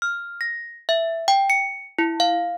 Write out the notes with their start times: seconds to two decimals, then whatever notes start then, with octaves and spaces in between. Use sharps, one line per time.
0.02 F6
0.41 A#6
0.89 E5
1.28 G5
1.50 C#7
1.99 E4
2.20 F5